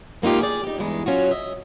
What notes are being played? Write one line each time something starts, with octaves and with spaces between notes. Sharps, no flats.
G#2 A#3 D#4 F4 G4
G#4 D5
D#4 G4
E2 G2 E3 G#3 D#4
F#3 C#4 F4 F#4
D#5 E5